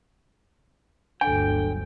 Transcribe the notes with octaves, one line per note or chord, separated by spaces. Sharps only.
G1 D2 F#3 D4 A4 G5 G#5